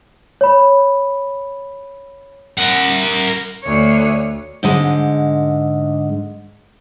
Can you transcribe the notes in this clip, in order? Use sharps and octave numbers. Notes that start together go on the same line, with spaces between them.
C#5 B5
A#4 F#5
D2 C#5
G#2 D3 G#3